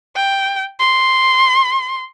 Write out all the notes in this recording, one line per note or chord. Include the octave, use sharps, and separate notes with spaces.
G5
C6